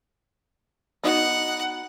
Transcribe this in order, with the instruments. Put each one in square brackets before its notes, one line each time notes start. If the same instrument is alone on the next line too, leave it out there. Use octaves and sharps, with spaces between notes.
[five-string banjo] B3 D#4 F#4 [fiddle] F#5